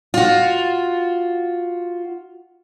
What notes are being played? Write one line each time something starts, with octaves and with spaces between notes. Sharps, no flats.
F4 F#4